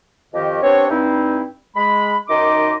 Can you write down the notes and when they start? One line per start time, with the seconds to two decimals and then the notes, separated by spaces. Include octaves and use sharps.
0.34 F2 D#3 G4 D#5
0.63 B3 C4 D4 G4 C#5
0.89 G2 C4 D#4 E4
1.76 G#3 B5
2.28 F#2 D#3 D#4 D#5 C6 D6